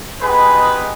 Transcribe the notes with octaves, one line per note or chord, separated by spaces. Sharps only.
G#3 B3 D#4 G4 G#4 B4